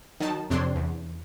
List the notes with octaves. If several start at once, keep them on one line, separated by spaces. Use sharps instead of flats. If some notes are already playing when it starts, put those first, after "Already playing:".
D#3 F#3 D#4 A5
F2 C3 C4 D4 C#5 C6
E2